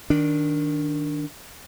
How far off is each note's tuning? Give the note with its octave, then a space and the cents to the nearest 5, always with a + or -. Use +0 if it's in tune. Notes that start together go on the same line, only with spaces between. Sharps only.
D#3 +0 D4 +0